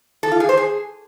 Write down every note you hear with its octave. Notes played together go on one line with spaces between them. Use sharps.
A4
F4
G#4
C5
G#4